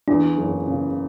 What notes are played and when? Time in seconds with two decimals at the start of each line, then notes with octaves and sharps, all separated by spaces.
0.08 E2 D4
0.37 F#1
0.67 C#3